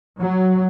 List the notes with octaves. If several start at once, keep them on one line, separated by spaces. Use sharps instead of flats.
F#3